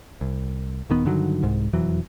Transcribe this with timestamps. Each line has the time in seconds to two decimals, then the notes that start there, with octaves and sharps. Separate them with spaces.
0.21 C2
0.90 D#1 D#3 B3
1.05 G2 D3 D#3 F#3
1.43 C2 G#2
1.73 E1 F2 E3 F#3